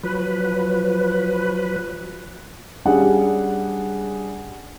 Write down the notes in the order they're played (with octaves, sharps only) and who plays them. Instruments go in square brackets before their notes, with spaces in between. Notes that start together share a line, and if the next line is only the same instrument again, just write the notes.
[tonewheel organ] F3 F#3 B4
[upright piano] G3 C#4 D4 G#4 F#5